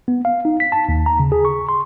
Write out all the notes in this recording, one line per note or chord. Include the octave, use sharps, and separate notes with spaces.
B3
F5
D#4
B6
A5
D#2
A#5
C#3
G#4
C#6
C6